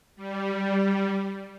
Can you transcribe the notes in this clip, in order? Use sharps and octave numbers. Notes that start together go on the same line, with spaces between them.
G3